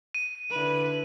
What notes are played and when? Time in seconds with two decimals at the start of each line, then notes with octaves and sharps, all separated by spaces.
0.15 D#7
0.51 D3 E4 B4